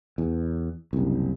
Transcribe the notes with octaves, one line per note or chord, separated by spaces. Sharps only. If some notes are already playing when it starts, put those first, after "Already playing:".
E2
F#1 C2